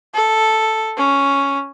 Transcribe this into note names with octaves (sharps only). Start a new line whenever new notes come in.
A4
C#4